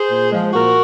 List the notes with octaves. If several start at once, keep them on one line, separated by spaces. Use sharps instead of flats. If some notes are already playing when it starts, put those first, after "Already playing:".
Already playing: G#4 C5
A#2
F3 G#3
A#2 F#4 A#4